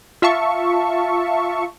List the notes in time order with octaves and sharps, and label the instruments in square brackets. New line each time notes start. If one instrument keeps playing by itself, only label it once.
[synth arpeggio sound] F4 E5 F5 A5 C#6